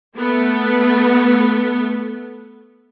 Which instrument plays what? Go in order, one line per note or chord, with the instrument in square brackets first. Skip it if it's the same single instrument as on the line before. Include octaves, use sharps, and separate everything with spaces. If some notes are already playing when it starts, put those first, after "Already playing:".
[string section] A3 B3